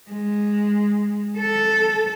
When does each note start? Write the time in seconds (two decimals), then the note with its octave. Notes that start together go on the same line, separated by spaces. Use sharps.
0.10 G#3
1.38 A4